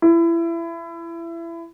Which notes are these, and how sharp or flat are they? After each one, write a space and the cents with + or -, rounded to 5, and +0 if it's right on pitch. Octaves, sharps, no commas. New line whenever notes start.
E4 +25